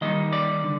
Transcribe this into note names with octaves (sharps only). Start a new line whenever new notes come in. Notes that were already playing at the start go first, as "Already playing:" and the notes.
D#3 G3 A#3 D#4 D#5
D5
D3